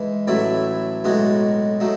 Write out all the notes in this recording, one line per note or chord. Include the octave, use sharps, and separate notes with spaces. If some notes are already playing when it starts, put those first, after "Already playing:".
Already playing: E3 G#3 D#4
A1 A2 F#3 A3 E4
B1 A2 G#3 D#4 F#4
F#3 A3 D#4